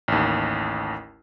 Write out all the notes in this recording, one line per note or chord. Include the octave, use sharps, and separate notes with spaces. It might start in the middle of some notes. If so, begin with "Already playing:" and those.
A1 D#2